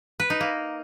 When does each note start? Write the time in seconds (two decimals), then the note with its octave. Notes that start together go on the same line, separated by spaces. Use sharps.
0.20 B4
0.30 D#4
0.41 A#3